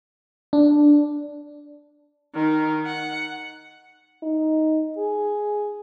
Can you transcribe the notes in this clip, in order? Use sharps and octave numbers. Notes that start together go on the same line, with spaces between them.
D4
D#3
F#5
D#4
G#4